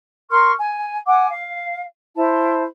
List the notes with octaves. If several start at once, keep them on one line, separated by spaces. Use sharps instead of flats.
A#4 C6 C#6 F6
G#5
F#5 G#5 D6
F5
E4 C5 A5